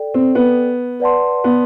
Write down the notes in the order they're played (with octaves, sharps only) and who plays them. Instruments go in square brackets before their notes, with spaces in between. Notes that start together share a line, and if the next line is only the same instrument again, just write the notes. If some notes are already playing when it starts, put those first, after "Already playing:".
Already playing: [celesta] A4 D5 G5
[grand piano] C4
B3
[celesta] B4 D5 F#5 A5 C6
[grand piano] B3